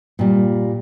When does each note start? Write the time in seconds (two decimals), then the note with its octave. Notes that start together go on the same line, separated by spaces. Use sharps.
0.19 A#2 G3